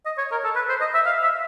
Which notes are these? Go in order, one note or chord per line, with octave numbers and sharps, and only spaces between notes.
D#5
C#5
A#4
A4
B4
C5
D#5
E5
F5
E5